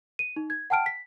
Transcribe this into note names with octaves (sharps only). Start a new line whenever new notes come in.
D#7
D#4
G#6
F#5 G5 A5 F6 D7
B6